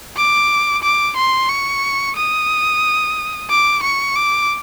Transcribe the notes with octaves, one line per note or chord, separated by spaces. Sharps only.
D6
D6
C6
C#6
D#6
D6
C#6
D6